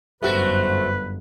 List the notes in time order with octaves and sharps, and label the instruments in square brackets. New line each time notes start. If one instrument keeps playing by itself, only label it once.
[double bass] G1 F#2 [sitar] A3 F#4 [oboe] B4 [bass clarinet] C5